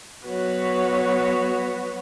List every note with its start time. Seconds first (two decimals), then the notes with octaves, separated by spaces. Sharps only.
0.24 F#3 B3 F#4 B4 C#5